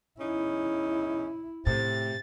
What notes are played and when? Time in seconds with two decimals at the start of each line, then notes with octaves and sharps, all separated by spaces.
0.19 E2 C#4 D#4 E4
1.67 A2 C3 A6